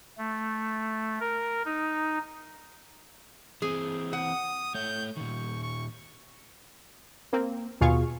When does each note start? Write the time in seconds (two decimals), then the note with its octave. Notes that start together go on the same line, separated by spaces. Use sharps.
0.18 A3
1.20 A#4
1.65 D#4
3.62 E3 C4 G#4
4.13 F#5 D#6
4.75 A3 C#5 G6
5.17 A#2 D#3 C#6
5.63 C#6
7.33 A#3 C4
7.81 D#2 B2 F4 G#4 F5 C#6